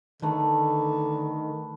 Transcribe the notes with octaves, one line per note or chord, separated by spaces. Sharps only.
D3 D#3 A3 B4